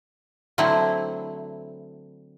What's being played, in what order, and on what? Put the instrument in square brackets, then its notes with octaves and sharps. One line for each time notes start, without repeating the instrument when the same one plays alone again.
[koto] D3 F#3 A3 C4 E4